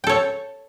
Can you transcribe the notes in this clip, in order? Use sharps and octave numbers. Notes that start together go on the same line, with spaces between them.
A4 C#5 G5